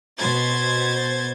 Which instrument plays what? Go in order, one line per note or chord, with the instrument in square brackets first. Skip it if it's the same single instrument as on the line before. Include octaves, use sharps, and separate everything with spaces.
[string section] B2 C5 G#6 A6